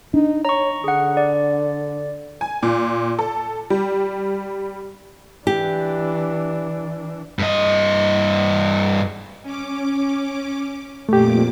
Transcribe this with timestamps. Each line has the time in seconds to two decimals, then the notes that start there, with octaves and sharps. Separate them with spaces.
0.14 D4 D#4
0.45 C#5 A#5 C#6
0.84 D3 G#4 F#5
1.17 D5
2.41 G#5
2.63 A#2
3.19 A4
3.70 G3
5.47 E3 D4 G4
7.39 G2 D#5
9.43 C#4 D6
11.09 F2 A#2 A3 G4 D6